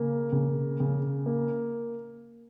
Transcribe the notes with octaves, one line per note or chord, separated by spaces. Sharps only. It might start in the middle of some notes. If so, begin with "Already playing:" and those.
Already playing: C#3 A#3
C#3
C#3
A#3